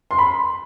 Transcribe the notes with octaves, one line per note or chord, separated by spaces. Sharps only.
C6
B5